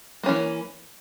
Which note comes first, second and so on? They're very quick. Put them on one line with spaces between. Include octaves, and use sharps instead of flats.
A#3 C#4 E3